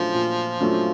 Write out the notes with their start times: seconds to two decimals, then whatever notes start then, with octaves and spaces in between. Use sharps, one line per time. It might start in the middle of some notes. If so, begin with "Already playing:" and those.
Already playing: A#2 F3 F#3 A3 D4 F4
0.14 A#2
0.61 F#3 A3 D4 F4